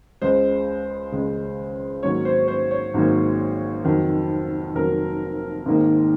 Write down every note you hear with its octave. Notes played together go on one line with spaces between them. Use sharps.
C#2 C#3 G#3 C5
C#2 C#3 G#3
G#1 G#2 F#3 A#3 C#5
C5
C5
C#5
G#1 G#2 F#3 A#3
F1 F2 D#3 F#3
F1 F2 D#3 F#3 A#4
G#1 G#2 D#3 A#3